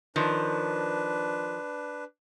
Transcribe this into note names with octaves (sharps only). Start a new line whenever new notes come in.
D#3 F3 D4 B4